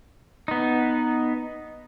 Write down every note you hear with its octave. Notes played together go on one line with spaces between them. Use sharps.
B3 D#4